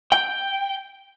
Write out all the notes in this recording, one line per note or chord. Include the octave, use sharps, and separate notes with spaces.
G5